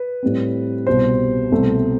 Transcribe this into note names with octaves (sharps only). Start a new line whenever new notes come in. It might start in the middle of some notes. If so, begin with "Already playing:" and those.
Already playing: B4
A2 G3 C4
C2 B2 G3 C4 C5
C2 B2 A3 C4